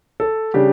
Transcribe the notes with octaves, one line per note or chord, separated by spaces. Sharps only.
A4
C#3 G3 D4 G4